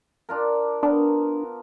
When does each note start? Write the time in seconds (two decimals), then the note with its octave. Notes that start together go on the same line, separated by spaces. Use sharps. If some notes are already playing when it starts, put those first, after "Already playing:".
0.29 D4 F4 A#4
0.83 B3 D4 A#4